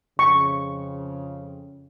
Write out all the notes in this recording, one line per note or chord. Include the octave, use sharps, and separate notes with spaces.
F2 C#3 C#6